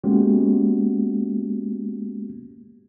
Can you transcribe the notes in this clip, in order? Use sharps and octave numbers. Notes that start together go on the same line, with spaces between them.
G#3 A#3 B3 C#4 F#4 G4